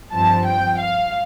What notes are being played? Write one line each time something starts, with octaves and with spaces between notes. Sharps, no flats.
G2 F3 C4 A5
G5
F5